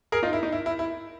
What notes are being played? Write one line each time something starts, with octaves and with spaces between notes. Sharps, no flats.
G#4 A#4
D#4 F4
E4
D#4
E4
E4
E4